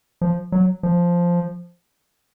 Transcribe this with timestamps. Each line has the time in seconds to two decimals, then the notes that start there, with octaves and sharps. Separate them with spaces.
0.21 F3
0.52 F#3
0.83 F3